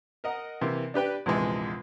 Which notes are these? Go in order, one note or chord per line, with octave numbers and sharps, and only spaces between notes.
A#4 D#5 F#5
C3 E3 A#3
D4 G4 B4 G5
A#1 E2 C3 E3 G#3